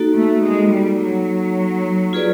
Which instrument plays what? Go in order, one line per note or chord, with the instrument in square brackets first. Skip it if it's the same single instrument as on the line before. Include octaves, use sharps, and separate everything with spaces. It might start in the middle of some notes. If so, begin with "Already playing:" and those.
Already playing: [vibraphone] A#3 D#4 F#4 A4
[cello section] A3
G#3
G3
F#3
[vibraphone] F4 G#4 B4 D5